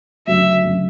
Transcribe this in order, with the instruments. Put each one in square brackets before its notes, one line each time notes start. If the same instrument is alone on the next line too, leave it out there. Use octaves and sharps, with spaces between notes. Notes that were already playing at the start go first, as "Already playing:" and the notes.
[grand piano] D2 C#3 F#3 [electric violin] E5
[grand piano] D2 C#3 F#3